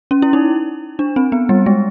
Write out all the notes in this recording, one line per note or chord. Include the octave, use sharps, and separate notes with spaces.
C#4
E4
D#4
D4
C4
B3
G3
G#3